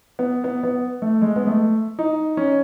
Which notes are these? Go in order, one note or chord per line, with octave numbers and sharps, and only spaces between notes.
B3
B3
B3
A3
G#3
B3
A3
D#4
C#4